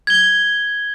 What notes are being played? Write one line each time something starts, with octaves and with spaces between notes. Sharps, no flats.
G#6 G7